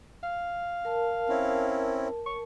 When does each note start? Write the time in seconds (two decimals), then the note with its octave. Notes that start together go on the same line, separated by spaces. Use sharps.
0.23 F5
0.85 A#4 A5
1.29 C4 C#4 E4
2.26 C#6